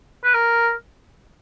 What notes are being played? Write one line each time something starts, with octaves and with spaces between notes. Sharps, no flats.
B4
A#4